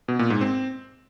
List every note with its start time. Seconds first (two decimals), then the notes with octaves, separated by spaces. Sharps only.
0.08 B2
0.19 A#2
0.30 G#2
0.41 C4